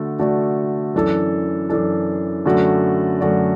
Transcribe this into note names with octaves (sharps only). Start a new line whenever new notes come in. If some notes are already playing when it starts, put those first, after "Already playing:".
Already playing: D3 A3 F#4 A4
D3 A3 F#4 A4 D5
F#2 E3 D4 A4
F#2 E3 D4 A4
F#2 D3 A3 F#4 D5
F#2 D3 A3 F#4 D5